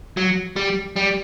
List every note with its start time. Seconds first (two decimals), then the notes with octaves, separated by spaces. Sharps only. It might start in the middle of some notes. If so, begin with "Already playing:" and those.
0.17 F#3
0.56 G3
0.96 G3